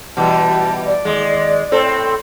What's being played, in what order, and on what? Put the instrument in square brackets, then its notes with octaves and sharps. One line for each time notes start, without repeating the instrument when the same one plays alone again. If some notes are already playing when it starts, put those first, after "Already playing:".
[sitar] B2 E3 G3 [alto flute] A5
[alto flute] D5
[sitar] D#2 G#3
A2 C4 A4